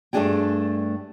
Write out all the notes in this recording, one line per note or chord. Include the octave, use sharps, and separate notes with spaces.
G2 A3 C#4 D4 G#4 G5